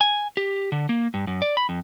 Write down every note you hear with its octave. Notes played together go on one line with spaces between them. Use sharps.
G#5
G4
D3
A#3
G2
F#2
D5
B5
F2